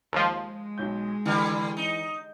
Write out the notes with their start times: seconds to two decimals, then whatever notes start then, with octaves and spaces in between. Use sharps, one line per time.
0.13 D#2 F3 G#3
0.78 B1 G6
1.26 D3 E3 G3
1.77 D#4